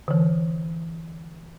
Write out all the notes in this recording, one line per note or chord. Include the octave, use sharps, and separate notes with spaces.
D3 E3